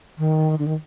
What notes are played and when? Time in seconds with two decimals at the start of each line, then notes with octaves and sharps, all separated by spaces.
0.18 D#3
0.59 D3
0.67 D#3